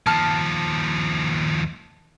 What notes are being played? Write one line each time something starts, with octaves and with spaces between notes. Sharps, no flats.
D#2 F3 A5 F6